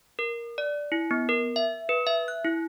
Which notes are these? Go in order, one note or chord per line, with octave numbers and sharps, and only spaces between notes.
A#4
D5
E4
B3
A#4
E5
B4
E5
F#6
E4